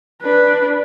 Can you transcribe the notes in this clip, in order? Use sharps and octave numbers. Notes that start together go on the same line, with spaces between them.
D4 B4